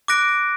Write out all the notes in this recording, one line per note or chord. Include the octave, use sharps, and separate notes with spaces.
D6 F#6 A#6 D7